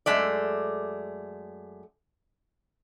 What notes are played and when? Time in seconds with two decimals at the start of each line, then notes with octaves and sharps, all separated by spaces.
0.06 F#2 G#3 A3 D5